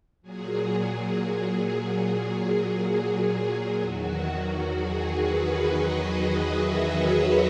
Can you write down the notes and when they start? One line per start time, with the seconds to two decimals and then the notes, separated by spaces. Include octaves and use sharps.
0.22 A#2 F#3 G#4
3.81 E2 D#3 F#3 F#4
4.27 F#4
4.71 G#4
5.16 B4
5.60 D#5
6.50 E5
6.96 C#5